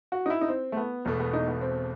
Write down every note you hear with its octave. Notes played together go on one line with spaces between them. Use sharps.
F#4
D#4
E4
D#4
C4
A3
B3
E1 E2 B2 A3 B3
B3
D#4
B3
C4